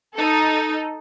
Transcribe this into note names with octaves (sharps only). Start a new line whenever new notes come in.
D#4 A4